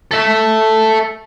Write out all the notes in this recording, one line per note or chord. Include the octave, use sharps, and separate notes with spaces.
A4 E5